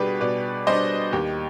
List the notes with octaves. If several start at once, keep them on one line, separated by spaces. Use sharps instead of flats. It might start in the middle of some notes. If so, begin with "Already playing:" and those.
Already playing: B2 G3 D4 G4 G#4 B4
B2 B4 D5
G3 D4 C5 D#5
D#2 G4